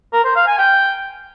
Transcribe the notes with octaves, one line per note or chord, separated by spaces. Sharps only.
A#4
C5
F5
G#5
G5